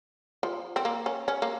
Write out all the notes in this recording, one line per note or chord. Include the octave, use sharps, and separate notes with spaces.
F3
C4
A#3
C#4
C#4
A#3